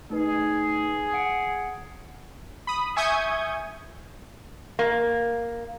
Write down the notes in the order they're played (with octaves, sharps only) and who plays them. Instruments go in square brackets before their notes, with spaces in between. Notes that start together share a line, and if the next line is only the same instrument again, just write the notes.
[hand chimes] A3 D#4 B4 [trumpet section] G#4
[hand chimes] F#5 C#7 D7
[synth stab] B5 D#6
E5 G#5 C#6 D#6 G6 G#6
[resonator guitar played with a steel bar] A#3